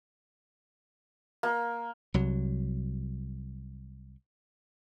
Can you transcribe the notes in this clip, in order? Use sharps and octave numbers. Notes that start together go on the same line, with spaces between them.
A#3
C2 F#3